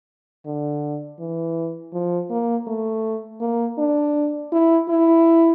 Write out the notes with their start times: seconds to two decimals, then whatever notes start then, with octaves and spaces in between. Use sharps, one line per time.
0.46 D3
1.19 E3
1.93 F3
2.31 A#3
2.67 A3
3.41 A#3
3.78 D4
4.52 E4
4.89 E4